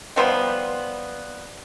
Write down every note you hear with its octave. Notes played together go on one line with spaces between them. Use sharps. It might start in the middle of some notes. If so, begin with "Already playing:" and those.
D#3 F3 G3 B3